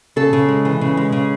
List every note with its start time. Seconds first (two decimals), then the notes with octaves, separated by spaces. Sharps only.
0.16 C#3 A4
0.33 C#3
0.49 G#3
0.65 E3
0.81 C#3
0.97 G#3
1.12 C#3